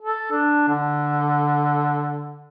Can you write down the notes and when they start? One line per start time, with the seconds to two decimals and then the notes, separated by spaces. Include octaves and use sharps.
0.02 A4
0.32 D4
0.68 D3